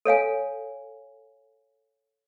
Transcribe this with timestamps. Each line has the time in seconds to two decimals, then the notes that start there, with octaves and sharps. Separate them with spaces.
0.05 A4 C#5 F5 G#5